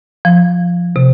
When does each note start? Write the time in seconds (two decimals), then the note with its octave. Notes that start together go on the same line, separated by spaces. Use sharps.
0.25 F3
0.96 C3